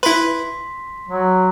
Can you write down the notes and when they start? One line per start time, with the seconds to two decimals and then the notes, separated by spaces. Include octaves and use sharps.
0.03 E4 B4 C6 B6
1.09 F#3